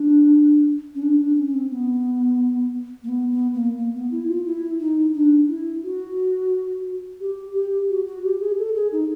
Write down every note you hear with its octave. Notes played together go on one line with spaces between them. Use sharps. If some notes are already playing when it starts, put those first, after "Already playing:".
Already playing: D4
C#4
D4
D4
C#4
C#4
C4
B3
A#3
B3
B3
A#3
A#3
B3
E4
F4
E4
D#4
D4
E4
F#4
G4
G4
F#4
F#4
G4
G#4
A4
G#4
D#4